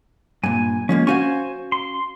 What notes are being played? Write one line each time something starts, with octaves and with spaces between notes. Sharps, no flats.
G2 A#2 G#5
F3 G#3 A#3 C#4
C#4 F#4 C5 F5 G#5 C#6
C6